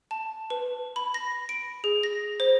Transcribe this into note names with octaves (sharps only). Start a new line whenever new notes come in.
A5
B4
B5
A#6
D7
G#4
A#6
C5